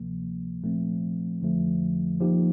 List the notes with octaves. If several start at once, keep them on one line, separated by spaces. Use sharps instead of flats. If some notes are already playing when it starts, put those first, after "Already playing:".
Already playing: D2 C3 F3 A#3
A#2 F3 A3 C4
F2 D3 F3 A3
F3 A#3 D#4 G4